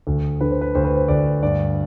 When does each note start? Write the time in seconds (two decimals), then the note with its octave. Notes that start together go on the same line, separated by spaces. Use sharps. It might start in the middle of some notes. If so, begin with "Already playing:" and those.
0.07 D2
0.41 D3 B4
0.51 C5
0.61 B4
0.75 D2 C5
0.85 B4
0.96 C5
1.08 D2 D5
1.43 G2 D5